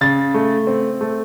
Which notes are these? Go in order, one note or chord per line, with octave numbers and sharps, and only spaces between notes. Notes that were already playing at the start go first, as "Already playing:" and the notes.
C#3 A6
A3
C4
A3